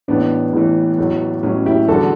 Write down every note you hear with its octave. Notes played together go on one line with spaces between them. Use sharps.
A1 A2 E3 B3 D4
A1 A2 E3
A1 A2 F#3
A1 A2 F#3 C#4
E4 G4
E2 D3 G3 F#4 A4